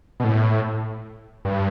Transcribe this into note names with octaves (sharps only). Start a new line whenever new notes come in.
B2
A2
G2